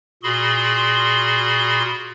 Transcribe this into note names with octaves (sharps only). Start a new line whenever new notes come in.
A#2 F#4 G#4 B5 C6